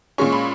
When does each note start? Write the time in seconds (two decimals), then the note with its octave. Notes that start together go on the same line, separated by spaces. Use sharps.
0.18 A#2 G#3 C#4 C#6
0.32 B5